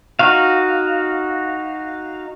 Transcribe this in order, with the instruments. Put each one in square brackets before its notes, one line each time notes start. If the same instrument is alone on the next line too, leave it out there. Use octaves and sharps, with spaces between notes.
[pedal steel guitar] D#4 F#4 F5